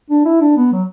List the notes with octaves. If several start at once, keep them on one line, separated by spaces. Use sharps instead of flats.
D4
E4
D4
B3
F#3